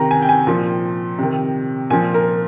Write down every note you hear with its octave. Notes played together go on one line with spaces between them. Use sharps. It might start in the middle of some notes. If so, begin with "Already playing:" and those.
Already playing: C3 D#3 A#5
G#5
G5
G#5
A#2 F3
C3 D#3
A#2 F3 G#5
A#4